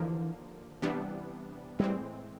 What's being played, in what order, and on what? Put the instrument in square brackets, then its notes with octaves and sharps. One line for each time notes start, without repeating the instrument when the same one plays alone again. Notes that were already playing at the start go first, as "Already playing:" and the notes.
Already playing: [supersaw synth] D#2 D3 F3 A#3 [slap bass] E3
[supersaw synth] C3 E3 G3 B3 D4
[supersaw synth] A2 E3 G#3 C4 [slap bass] G3